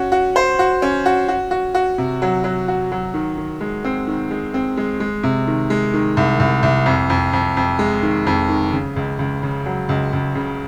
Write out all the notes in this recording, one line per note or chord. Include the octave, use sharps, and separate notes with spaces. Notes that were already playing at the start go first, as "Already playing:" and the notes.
Already playing: C#4 F#4
F#4
C5
F#4
C#4
F#4
F#4
F#4
F#4
C3
F#3
F#3
F#4
F#3
D#3
D#3
G#3
C4
D#3
G#3
C4
G#3
G#3
C3
D#3
G#3
D#3
C2
C2
C2
F2
F2
F2
F2
G#3
D#3
F2
D#3
C#3
C#2
C#2
C#3
F#3
C#2
C#2
C#3